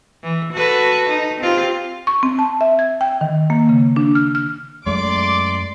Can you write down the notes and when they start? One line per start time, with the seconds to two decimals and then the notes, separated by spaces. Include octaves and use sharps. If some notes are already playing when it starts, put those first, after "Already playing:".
0.23 E3
0.53 F#4 A4 B4
1.10 D#4
1.40 C4 F4 G4
2.07 C#6
2.23 C4
2.39 A5
2.61 E5
2.79 G#6
3.01 G5
3.21 D#3
3.50 A#3
3.69 C#3
3.96 D4
4.15 F6
4.35 F6
4.87 F#2 G#3 A3 D5 C6 D6